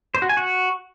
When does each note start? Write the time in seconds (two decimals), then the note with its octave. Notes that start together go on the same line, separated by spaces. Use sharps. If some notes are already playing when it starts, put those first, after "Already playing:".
0.15 C5
0.22 F#4
0.29 G#5
0.37 F#4